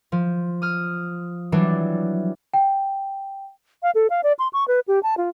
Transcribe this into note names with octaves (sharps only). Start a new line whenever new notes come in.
F3
D#6 F6
E3 F#3 G3 D4
G5
F5
A4
F5
D5
C6
C#6
B4
G4
A5
F4